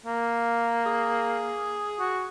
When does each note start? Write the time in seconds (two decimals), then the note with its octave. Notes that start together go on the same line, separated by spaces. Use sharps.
0.06 A#3
0.86 G#4
2.00 F#4